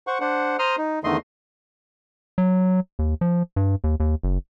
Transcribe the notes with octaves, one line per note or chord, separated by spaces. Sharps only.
C5 F#5 C#6
D4 C5 F#5
C5 A#5 C6 D#6 F6
D#4
E2 D3 D#3 A3 D#5 C6
F#3
D#2
F3
G2
D#2
D#2
F#1